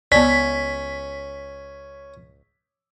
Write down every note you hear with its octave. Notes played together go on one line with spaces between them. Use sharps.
C#2 B3 C#4 D5 B6